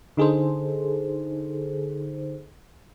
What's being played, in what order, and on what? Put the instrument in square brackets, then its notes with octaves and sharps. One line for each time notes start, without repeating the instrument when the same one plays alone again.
[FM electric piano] D3 D#4 G#4 A4 C5